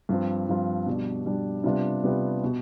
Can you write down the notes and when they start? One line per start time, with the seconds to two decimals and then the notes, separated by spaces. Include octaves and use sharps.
0.09 G2 F3 C4 F4
0.49 G2 F3 C4 F4
0.86 B2 G3 D4
1.25 B2 G3 D4
1.64 C3 G3 B3 D4 F4
2.04 C3 G3 B3 D4 F4
2.44 B2